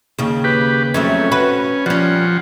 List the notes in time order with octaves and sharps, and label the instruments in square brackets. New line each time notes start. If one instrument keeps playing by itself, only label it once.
[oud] D#2 C#3
[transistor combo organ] G4 B4
[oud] F2 F#3 A3 [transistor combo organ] C#4
[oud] F#4 B4
[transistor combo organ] F3 F#5 [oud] G3 C#4